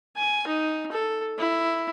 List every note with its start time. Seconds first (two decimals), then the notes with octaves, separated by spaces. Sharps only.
0.17 G#5
0.47 D#4
0.92 A4
1.38 E4